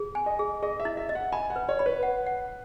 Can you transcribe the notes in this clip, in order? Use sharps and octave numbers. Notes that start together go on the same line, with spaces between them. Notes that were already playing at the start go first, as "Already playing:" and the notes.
Already playing: G#4
G#5
D#5
G#4
G#4 D#5
E5
E4
E5
D#5
F#5
G#5 B5
F#5
B4
C#5
C#5 B5
B4
F#5
F#5